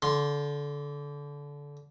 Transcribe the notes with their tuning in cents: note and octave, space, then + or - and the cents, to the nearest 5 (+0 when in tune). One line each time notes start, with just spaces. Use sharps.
D3 -25 C6 +0